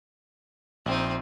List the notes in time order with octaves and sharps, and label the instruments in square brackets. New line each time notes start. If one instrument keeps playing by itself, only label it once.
[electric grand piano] A#1 [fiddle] C4 D#4